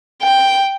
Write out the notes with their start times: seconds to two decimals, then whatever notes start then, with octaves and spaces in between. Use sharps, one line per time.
0.23 G5